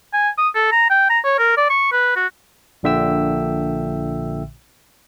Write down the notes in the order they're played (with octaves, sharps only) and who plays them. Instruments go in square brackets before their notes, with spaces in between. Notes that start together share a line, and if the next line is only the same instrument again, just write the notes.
[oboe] G#5
D#6
A4
A#5
G5
A#5
C#5
A#4
D5
C#6
B4
F#4
[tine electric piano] A#1 A#2 D3 E5 G5 E6